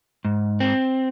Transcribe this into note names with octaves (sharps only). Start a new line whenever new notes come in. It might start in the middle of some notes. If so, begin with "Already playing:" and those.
G#2
C4